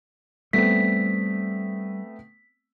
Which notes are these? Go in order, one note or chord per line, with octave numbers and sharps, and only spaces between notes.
G3 A3 B3 C4 B6